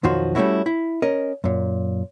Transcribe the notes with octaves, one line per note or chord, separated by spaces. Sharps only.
B1 F2 D#3 F3 F#4 C6
G3 A3 A#3 C#4 E4 F#4
E4
C#4 A#4 D#5
F#2 A#2